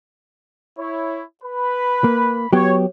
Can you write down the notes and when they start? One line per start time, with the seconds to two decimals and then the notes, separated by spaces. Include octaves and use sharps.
0.78 E4 C#5
1.43 B4 B5
2.04 A#3
2.53 F#3 B3 G4 C#5